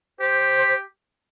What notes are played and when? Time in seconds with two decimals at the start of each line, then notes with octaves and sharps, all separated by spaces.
0.20 G4 C5